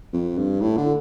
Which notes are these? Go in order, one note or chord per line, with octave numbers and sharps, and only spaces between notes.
F2
G2
A2
D3